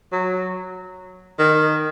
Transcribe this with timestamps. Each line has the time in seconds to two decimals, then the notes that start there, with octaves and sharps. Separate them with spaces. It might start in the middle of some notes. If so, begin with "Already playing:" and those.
0.12 F#3
1.39 D#3